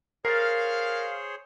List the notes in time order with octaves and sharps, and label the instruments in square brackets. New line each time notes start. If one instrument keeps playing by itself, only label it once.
[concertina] G#4 C5 C#5 [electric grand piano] A#4 [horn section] F5 [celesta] A6 C7